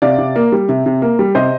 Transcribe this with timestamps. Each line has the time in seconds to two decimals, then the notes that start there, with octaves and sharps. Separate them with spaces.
0.02 C3 D5 F5
0.18 C3
0.36 A#3
0.52 G3
0.69 C3
0.86 C3
1.02 A#3
1.19 G3
1.35 C3 C5 D#5